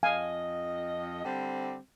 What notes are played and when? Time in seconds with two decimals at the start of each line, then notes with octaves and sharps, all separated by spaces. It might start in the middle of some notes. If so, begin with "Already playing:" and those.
0.03 F2 D#5 F5 G#5
1.24 D3 G3 C4